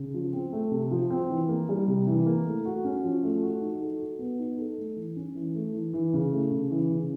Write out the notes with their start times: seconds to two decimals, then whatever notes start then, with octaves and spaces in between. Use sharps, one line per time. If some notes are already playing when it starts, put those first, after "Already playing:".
Already playing: C#3
0.14 F3
0.33 C4
0.52 A3
0.71 C3
0.91 F3
1.10 C4
1.30 E3
1.49 A#3
1.69 G3
1.88 C3
2.07 E3
2.26 A#3
2.46 A3
2.65 F#4
2.84 C#4
3.04 F3
3.23 A3
3.43 F#4
3.61 D#4
3.81 A4
4.00 F#4
4.19 B3
4.39 D#4
4.58 A4
4.78 A3
4.96 E3
5.16 C#4
5.35 E3
5.55 A3
5.74 E3
5.93 E3
6.13 C#3
6.32 A3
6.51 C#3
6.71 E3
6.90 C#3